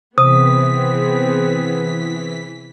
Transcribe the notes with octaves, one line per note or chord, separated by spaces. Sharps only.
C3 E3 B3 C4 G#4 D#6 B6